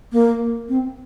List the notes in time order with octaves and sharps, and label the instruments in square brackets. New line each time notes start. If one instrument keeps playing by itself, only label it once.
[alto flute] A#3
C4